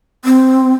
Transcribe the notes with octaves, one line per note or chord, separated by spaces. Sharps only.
C4